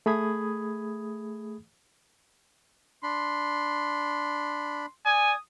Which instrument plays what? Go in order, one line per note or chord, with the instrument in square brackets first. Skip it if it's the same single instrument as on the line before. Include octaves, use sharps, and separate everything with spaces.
[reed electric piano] A3 G#4 B5 D#6 G#6
[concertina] D4 B5 [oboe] C6
[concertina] D5 [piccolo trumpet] G#5 [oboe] D#6